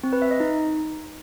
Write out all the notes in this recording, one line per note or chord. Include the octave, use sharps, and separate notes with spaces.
C4
B4
E5
D#5
D#4